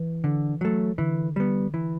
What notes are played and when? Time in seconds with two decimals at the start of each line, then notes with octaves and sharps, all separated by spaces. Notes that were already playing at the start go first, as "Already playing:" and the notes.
Already playing: E3
0.24 D3
0.61 F#3 A3
0.98 D3 E3
1.36 G3 B3
1.74 E3